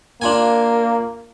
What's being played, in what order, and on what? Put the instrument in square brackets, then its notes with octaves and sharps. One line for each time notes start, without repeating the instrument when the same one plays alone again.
[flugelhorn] A#3 [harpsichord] D4 F4 G#5